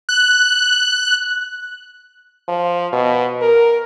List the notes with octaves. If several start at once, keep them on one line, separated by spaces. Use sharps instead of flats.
F#6
F3
B2
A#4